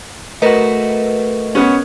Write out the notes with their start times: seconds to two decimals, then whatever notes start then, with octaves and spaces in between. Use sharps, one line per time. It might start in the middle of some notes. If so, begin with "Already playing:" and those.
0.42 A3 F#4 A#4 B4 D#5
1.55 B3 C#4